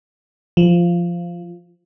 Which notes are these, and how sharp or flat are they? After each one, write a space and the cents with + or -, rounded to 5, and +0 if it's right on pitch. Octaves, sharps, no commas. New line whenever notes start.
F3 -10